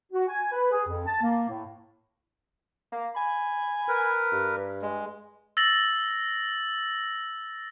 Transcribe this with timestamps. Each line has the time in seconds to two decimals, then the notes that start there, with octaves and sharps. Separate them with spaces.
0.12 F#4
0.28 G#5
0.52 B4
0.71 G#4
0.88 F2
1.06 A5
1.22 A#3
1.48 A2
2.93 A#3
3.15 G#5 B5
3.88 A#4 B4
4.32 G2
4.82 G#3
5.57 E6 A6 A#6 F#7